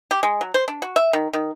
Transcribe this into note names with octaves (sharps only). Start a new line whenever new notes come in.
G4
G#3
F#3
C5
D4
F#4
E5
D#3
D#3